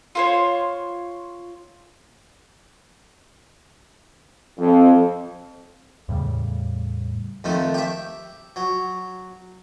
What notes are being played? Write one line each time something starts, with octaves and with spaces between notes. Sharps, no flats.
F4 C5 C#5
F2
E2 A2 C#3 G3
F2 D#3 A3
G4 E5
F#3